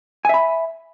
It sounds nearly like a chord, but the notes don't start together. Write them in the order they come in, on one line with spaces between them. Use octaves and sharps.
G#5 E5 B5